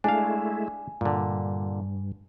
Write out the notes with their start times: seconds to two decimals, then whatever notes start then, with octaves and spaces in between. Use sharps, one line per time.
0.04 G#3 A3 D4 E4 F5 G#5
1.01 G2 A#2 D3